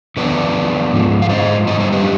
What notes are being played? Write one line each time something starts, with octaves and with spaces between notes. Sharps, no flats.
D3 F3 B3 D4 B4 D5
G#2 F3 G#3
F5
C5 D#5
D3 G3 B3 D#4 C5 D#5
C5 D#5
G4 B4